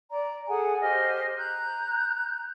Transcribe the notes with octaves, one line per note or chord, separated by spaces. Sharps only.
D5 A#5
G#4 A4 F#5 G#5
G4 C5 D#5 F6
A#5 F#6 G6